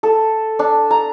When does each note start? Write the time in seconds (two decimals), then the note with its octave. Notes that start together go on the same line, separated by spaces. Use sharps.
0.03 A4
0.59 D4
0.91 A#5